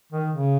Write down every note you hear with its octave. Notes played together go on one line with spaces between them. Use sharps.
D#3
C#3